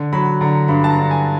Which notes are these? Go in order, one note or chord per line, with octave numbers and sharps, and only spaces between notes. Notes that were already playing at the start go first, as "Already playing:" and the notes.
Already playing: D3
F#3 B5
D3 A#5
G2 B5
A5
A#5
D3
G#5